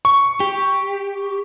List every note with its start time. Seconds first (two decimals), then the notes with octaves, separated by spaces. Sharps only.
0.05 C#6
0.40 G4